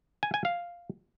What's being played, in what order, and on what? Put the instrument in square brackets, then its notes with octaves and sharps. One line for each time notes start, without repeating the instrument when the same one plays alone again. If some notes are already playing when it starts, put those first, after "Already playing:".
[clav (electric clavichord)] G#5
G#5
F5